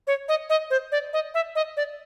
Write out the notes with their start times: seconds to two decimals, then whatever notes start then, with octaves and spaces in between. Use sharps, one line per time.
0.07 C#5
0.28 D#5
0.50 D#5
0.70 C5
0.92 D5
1.13 D#5
1.34 E5
1.55 D#5
1.77 D5